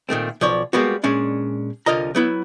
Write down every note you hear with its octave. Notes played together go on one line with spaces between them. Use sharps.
A#2 D#3 A3 C4
B1 F3 C#5 D5
G3 G#3 A#3 B3 F#4
A#2 G#3 C#4 D4
C2 D3 F4 A#4 D#5 A#5
F#3 B3 E4